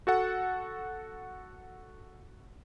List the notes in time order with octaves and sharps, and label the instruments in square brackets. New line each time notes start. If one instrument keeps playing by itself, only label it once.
[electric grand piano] F#4 A4 F#5